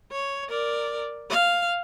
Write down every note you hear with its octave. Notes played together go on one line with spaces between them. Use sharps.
C#5
A#4 D5
F5